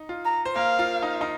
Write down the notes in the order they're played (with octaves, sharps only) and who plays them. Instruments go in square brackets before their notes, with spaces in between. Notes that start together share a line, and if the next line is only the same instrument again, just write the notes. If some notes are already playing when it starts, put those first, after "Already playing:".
Already playing: [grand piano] D#4
F4
[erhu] A#5
[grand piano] C5
[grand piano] A#3 A#4 [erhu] F5
[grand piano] F4
D#4
D#4